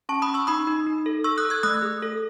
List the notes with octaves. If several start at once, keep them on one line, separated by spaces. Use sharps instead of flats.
C#4 A5 C#6
B5 D#6
C#4
C#6 E6
D#4 B5 D#6
D#4
D#4
A4
A4 C#6 E6
D#6 F#6
A4
E6 G#6
A3 D#6 F#6
G#4
A4